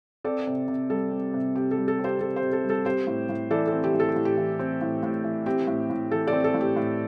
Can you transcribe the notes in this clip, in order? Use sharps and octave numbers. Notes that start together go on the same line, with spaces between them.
C4 A4 D5
C3
C3
G3 A4
C4
C3
C3 G4
A4
G3
A4
C4
G4 C5
C3 A4
G4 C5
C3
A4
G3
A4
C4 G4 C5
A2
A2
E3 A4 D5
C4 A4
G4
A2
A4
G4
A2
G4
E3
C4
A2
A2
E3
C4 G4
A2
A2
E3 A4
A4 D5
C4
A4
A2
G4
A2